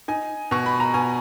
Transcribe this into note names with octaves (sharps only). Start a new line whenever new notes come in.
D#4 G#5
B2 C#6
B5
A#5
B2 G#5